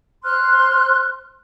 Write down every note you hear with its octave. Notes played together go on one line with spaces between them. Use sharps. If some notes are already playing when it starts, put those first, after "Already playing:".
C5 C6 F6 F#6